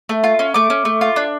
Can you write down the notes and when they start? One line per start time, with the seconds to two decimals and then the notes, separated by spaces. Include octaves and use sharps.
0.09 A3
0.24 F4
0.39 C#4
0.54 A3 D6
0.70 C#4
0.85 A3
1.01 F4
1.16 D4